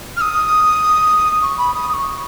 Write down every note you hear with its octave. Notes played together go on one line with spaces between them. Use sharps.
F6
D#6
C#6
B5
D#6
D#6
C#6